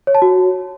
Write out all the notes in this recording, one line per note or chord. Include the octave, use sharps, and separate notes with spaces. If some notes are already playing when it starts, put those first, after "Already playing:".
C#5
A5
F#4